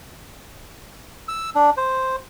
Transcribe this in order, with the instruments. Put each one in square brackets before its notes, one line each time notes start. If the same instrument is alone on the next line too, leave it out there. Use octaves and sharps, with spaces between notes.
[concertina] E6
D4
C5